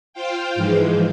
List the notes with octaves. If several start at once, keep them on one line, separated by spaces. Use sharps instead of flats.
F4 C5 F5 G5
G#2 E3 F3 G#3